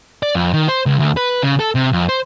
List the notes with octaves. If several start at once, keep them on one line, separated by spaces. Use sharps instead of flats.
D5
F2
D#3
C5
C#2
D2
B4
C#3
A4
C3
F2
C5